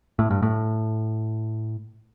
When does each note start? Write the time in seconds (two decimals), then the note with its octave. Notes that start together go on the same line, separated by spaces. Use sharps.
0.19 A2
0.30 G2
0.42 A2